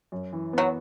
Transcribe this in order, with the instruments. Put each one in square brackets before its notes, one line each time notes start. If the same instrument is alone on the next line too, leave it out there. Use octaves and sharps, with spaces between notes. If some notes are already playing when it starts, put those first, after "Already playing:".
[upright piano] F#2
E3
[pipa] F#3 [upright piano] B3